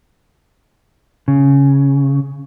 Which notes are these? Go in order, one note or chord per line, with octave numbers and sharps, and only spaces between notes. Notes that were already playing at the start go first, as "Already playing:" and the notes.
C#3